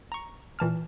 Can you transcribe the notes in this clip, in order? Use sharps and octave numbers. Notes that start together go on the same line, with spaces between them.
A#5 C#6
A#2 E3 A5 F6